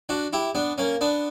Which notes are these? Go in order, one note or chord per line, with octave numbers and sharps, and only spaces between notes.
D4 F#4
E4 G4
B3 D4
A#3 C#4
B3 D4